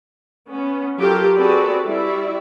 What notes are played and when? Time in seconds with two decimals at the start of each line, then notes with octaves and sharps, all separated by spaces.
0.48 B3 C#4
0.98 F#3 F4 G4 A4 A#4
1.35 C4 F#4 G#4 A4 B4 D5
1.84 G3 E4 F#4 D5 E5